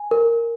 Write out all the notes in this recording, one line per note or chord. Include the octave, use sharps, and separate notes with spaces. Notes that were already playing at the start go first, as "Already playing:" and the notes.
Already playing: G#5
A#4